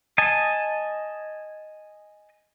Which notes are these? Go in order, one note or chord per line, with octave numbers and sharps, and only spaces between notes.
D#5 G#5 A5